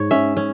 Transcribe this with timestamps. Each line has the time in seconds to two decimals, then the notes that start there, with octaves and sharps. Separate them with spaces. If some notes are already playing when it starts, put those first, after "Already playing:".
Already playing: G#2 C#5
0.11 C#4 E5
0.37 C#4